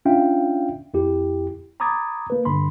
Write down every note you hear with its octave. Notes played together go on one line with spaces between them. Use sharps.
C#4 D4 F4 E5 F5 G5
F2 E4 G4
A#5 B5 D6 D#6 G#6 A6
A#3 B4
G2 D3 B5 C6